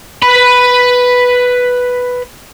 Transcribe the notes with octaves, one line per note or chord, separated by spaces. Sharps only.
B4 B5